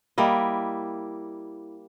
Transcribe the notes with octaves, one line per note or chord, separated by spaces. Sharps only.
G3 A#3 E4 D#5